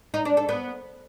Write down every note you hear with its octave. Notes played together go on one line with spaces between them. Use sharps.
D#4
D4
A4
B3